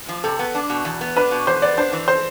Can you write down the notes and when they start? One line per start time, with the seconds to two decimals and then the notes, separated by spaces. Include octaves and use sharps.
0.09 F3
0.24 C3 A4
0.39 B3
0.55 D4
0.70 B2
0.85 E2
1.01 B3
1.16 D4 B4
1.31 B2
1.47 E2 C5
1.62 B3 D5
1.78 D4 C5
1.93 E3
2.08 C5